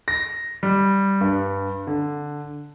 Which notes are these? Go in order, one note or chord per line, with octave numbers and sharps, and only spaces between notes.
A#6
G3
G2
D3